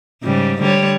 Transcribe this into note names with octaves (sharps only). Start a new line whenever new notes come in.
G#2 C#3 G3
D3 G3 C#5